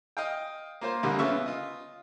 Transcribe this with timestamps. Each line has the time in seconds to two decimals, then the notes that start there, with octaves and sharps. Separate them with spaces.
0.17 D#5 F5 G5
0.81 A#3 F4 C5
1.03 C2 D3 G3 A#3
1.19 C#3 B3 F4 E5 C#6
1.46 F4 D#5